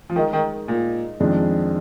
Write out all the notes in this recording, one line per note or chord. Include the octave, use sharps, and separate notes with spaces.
F3
D#3 G#3 D#4 A#4 D#5
D#3
A#2
F2 D#3 G#3 D4